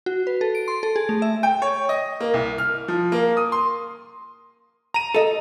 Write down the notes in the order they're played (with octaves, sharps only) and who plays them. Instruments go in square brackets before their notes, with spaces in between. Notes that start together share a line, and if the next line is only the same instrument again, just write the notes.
[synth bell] F#4
B4
A4
D7
C6
A4
G#4
A3
E5
[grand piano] G5
C#5
D#5
A#3
C2
F6
F3
A#3
D#6
C6
[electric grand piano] A#5 D#7
[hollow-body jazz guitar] A4 D#5